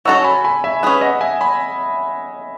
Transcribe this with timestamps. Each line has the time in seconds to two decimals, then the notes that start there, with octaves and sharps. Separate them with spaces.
0.05 F#3 C#4 F#4 A4 C#6 E6
0.24 G#5 B5
0.45 G#5 B5
0.64 E5 G#5
0.83 C#4 G#4 B4
1.01 D#5 F#5
1.21 E5 G#5
1.41 G#5 B5